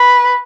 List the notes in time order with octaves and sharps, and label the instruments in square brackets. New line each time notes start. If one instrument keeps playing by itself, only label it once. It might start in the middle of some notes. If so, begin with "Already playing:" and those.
Already playing: [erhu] B4